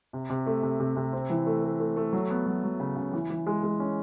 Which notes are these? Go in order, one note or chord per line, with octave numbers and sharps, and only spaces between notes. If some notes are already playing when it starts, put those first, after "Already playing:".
C3
C3
A3
C3
C3
C3
C4
E3
A3
A3
A3
A3
F#3
B3
F#3
F#3
C#3
C#3
E3
E3
G#3
G#3
C#4